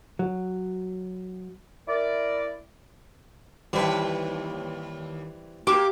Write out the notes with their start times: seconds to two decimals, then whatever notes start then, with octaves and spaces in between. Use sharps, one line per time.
0.19 F#3
1.88 E4 A#4 D5
3.73 D#2 E3 G3 C4 B4
5.67 A#3 G4 D6